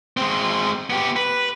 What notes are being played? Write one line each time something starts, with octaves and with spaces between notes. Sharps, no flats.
G#3 C4
B3 G4
B4